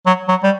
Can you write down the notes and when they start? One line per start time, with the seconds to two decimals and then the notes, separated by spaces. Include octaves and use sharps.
0.06 F#3
0.28 F#3
0.43 G3